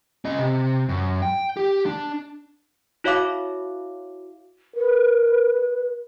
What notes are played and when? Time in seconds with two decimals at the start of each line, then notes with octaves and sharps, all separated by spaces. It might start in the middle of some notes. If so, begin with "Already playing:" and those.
0.25 C#4 D#5
0.38 C3
0.89 F#2
1.22 G5
1.57 G4
1.86 D4
3.04 E4 F#4 C#5 E5 F5 D6
4.76 A#4 B4